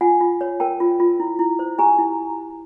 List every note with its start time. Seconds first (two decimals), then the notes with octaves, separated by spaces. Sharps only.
0.01 F4 F#5 G#5
0.21 F4
0.41 C#5
0.60 A#4 G5 A5
0.80 F4
1.00 F4
1.20 E4
1.39 E4
1.59 C5
1.78 G4 G#5 A#5
1.98 E4